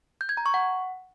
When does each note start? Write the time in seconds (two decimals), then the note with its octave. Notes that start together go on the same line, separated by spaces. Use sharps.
0.21 G6
0.29 G#6
0.37 A#5
0.46 C#6
0.54 F#5